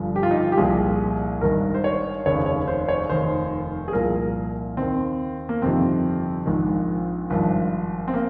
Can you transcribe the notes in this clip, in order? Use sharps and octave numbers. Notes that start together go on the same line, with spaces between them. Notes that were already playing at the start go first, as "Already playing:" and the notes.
Already playing: G1 G2 F3
G4
F4
D#4
F4
G4
C2 A#2 F3 G#4
G#1 G2 D#3 A#4
C5
C#5
F1 D#2 C#3 C#5
C#5
C5
C#5
F1 D#2 D#3 C5
G#4
C2 A#2 F3 A#4
D#2 D#3 C4
A#3
G1 F2 C3 D#3 C4
A#1 G#2 D#3
G#1 G2 F3
C4
A#3